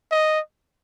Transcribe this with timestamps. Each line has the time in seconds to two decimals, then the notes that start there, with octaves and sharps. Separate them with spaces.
0.11 D#5